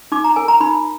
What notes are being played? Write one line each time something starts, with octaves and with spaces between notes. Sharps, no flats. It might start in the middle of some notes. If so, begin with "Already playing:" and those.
D#4 D6
A#5
A#4 G#5
A#5
D#4 B5